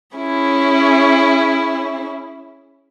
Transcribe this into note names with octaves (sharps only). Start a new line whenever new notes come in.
C#4 E4 G#4